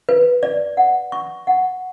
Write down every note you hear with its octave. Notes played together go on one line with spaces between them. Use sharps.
B4
D5
F#5
C#6
F#5